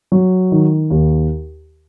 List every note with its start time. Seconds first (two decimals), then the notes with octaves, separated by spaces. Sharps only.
0.12 F#3
0.52 D#3
0.90 D#2